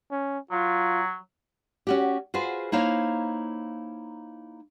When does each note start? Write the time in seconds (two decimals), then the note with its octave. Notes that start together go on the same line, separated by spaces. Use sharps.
0.11 C#4
0.51 F#3 F4
1.87 C#4 F#4 G4
2.34 F4 F#4 G#4 B4 C5
2.72 A#3 D#4 E4 C5 C#5 F5